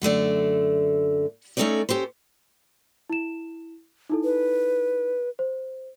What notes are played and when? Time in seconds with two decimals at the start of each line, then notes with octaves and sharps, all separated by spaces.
0.02 F#2 D3 A3 D5
1.57 A3 C#4 D#4 A4 C#5 D5
1.89 C#4 G4 A4 C5
3.10 E4 E7
4.10 D#4 E4 A4
4.24 B4
5.39 C5